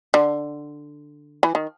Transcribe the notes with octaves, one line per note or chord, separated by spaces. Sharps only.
D3
E3
D#3